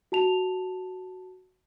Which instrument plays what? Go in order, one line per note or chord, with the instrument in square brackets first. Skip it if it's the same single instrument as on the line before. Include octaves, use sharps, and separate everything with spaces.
[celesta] F#4 A5 F7